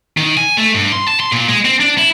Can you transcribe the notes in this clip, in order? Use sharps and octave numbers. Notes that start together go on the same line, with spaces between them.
D#3
G#5
A3
G2
C6
A5
C6
A#2
G#3
C4
D4
E4